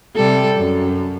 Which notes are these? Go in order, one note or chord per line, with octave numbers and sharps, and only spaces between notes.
C3 G3 A4
F#2